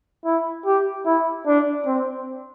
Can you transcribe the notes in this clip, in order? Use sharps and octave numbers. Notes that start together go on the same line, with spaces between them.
E4
G4
E4
D4
C4